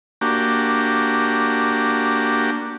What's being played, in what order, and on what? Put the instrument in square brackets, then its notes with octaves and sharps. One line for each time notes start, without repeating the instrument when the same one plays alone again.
[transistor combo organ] A#3 D4 F#4 G4